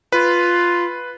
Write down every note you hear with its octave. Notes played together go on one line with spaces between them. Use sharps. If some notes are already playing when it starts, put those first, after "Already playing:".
F4 B4